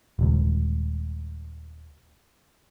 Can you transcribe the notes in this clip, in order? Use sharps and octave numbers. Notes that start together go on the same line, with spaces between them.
D#1 C#2